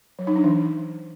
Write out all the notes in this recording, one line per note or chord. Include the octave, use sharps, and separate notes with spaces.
F#3
D#4
D4
E3